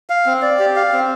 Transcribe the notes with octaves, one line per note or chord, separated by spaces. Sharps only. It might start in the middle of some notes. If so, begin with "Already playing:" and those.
F5
C4
D5
G4
F5
C4